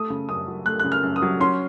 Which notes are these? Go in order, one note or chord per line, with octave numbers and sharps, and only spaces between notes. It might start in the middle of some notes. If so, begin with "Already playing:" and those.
Already playing: A3 D#6
C#3
F#2 D#6
F#3
A3 F#6
C#3 F#6
F6
F#2
D#6
F#3
C#4 C6